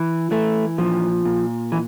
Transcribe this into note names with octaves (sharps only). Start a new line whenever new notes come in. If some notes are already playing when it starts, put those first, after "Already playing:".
Already playing: E3
E3 A3
A#2 F3
A#2
E3